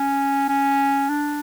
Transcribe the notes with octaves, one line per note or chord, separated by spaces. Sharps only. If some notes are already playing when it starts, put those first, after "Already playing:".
Already playing: C#4
C#4
D4